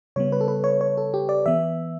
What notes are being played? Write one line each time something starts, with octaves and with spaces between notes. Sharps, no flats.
C#3 G3 B3 C#5
B4
A4
B4
C#5
C#5
A4
G4
D5
E3 B3 E5